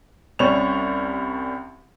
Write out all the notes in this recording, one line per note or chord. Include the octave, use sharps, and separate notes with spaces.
C2 G3 C#4 D5 C#6 F7